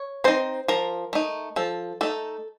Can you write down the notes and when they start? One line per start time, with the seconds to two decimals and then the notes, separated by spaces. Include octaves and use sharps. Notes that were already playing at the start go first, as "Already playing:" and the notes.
Already playing: C#5
0.24 C4 D#4 C5
0.68 F3 A#4
1.13 A3 D#4
1.56 F3 A4
2.01 A3 D#4 A4